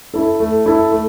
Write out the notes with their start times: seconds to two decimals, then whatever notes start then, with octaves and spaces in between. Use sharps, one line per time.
0.14 E4 A4
0.40 A3
0.66 E4 A4
0.92 A3